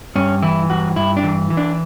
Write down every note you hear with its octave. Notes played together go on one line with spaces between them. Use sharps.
G2 C#4
E3 E4
G2 F#4
G2 E4
D4
E3
E3
D4